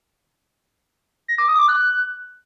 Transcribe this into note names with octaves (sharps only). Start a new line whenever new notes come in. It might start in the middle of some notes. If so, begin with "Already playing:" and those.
A#6
D6
D#6
D6
F#6